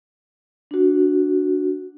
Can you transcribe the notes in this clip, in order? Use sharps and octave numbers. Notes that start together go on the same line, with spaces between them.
D4 F#4